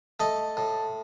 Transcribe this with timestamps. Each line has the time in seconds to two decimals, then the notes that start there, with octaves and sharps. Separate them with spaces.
0.20 A3 D#5
0.57 A2